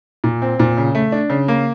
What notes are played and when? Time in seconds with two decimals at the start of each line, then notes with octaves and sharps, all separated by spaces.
0.24 A#2
0.42 C4
0.60 A#2
0.77 C#3
0.95 A3
1.12 D4
1.30 C#3
1.48 A#3